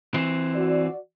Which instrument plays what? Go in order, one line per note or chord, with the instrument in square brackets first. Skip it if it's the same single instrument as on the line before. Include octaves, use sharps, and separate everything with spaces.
[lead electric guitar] E3 C4
[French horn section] F#4 D5